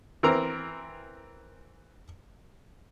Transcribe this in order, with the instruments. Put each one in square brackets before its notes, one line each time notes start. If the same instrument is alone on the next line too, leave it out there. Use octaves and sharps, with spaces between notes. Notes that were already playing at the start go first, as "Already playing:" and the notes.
[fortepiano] E3 C4 A#4 A#5